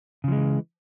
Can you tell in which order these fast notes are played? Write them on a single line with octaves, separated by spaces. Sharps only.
C#3 F3 G#3 E3